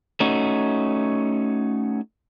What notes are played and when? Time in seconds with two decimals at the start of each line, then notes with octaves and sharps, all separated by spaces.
0.20 A3 C#4 D#4 F#4